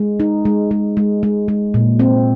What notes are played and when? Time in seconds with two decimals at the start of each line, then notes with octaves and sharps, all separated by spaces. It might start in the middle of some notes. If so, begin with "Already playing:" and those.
Already playing: G#3
0.20 D#4
0.45 G#3
0.71 G#3
0.97 G#3
1.23 G#3
1.48 G#3
1.74 A#2
1.99 C4